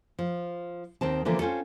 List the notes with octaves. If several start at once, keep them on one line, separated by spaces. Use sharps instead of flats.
F3
D#2 D#3 C4 A5
D3 E3 F3 A#3 B3
C4 C#4 F4 A4